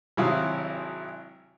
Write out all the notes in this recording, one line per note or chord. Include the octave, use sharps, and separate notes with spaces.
G#1 C3 F#3 E4 F5 D#6